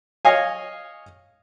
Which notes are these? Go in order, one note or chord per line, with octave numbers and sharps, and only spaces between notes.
C#5 D#5 F5 G#5